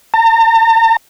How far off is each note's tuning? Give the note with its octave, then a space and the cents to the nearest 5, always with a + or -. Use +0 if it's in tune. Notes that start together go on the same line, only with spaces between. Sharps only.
A#5 -45